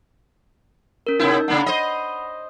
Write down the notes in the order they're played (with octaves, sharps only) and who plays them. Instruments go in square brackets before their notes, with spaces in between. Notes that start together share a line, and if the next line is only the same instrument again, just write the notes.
[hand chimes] C#4 A#4
[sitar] C3 B3 E4 [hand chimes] D#4 E6 G6
[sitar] C#3 A#3 D4 [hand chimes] F#5 B5
[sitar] C5 D#5